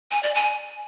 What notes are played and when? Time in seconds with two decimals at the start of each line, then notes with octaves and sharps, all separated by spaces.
0.11 G#5
0.23 D5
0.35 G#5